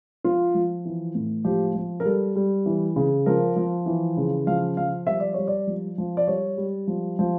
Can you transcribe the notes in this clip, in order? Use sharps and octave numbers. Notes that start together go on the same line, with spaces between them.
F3 F4
F3
E3
A2
F3 G4
F3
A#4
G3 A4
G3
E3
C#3
F3 A#4
F3
E3
C#3
F3 F5
F3 F5
G3 E5
D5
G3 C#5
D5
F3
F3
D5
G3 C#5
G3
F3
F3